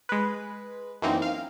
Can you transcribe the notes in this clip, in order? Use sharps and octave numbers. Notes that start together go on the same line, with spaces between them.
G#3 B4
F#2 E3 A#3 C4 D#4
F5